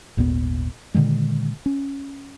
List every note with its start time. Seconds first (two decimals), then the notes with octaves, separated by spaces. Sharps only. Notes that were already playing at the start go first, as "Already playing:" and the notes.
0.17 G#1 D#2 A#2 B3
0.94 A#2 D3 D#3 G#3
1.66 C#4